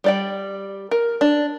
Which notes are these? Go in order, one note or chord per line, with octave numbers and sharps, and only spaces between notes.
G3 D5 G5
A#4
D4